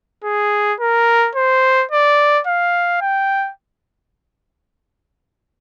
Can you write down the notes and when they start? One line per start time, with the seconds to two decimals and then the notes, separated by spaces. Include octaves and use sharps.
0.24 G#4
0.80 A#4
1.35 C5
1.91 D5
2.47 F5
3.01 G5